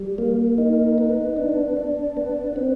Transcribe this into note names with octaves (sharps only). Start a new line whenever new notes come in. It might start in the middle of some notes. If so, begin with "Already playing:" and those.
Already playing: G3
A#3
D#4
B3
D4
D4
B3
C4